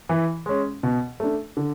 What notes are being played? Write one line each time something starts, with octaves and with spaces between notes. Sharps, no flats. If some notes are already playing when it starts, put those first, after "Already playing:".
E3
G#3 C#4
B2
A3 D4
D3